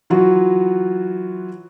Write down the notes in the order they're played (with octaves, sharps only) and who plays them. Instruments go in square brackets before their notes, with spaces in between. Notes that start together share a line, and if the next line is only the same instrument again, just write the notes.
[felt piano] E3 F#3 F4 F#4